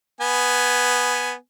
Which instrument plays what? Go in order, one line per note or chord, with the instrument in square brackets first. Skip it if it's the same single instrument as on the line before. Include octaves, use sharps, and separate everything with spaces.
[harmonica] B3 G#5